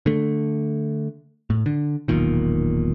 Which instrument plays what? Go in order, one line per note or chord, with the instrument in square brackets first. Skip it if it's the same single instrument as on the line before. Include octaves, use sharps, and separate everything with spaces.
[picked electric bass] D3 A3
A2
D3
E1 B1 A#2 D#3